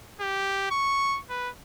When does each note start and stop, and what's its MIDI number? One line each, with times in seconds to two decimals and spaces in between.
0.21 0.69 67
0.71 1.20 85
1.29 1.49 71